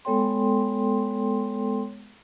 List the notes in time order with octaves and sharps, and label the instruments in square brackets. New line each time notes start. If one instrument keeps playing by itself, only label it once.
[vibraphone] G#3 B3 A4 C#5 G5 C6